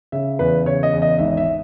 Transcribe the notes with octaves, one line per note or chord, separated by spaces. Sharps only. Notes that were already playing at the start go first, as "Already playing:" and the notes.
C#3 E5
E2 B4
C#3 C#5
D#5
E2
D#5
G#1 E5
E5